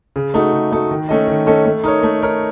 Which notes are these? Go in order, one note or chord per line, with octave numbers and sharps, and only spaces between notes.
C#3
A3 D#4 F#4
C#3
A3 D#4 F#4
D#3
A3 C#4 A4 D#5
D#3
A3 C#4 A4 D#5
A3
D#4 A#4 C#5
A3
D#4 A#4 C#5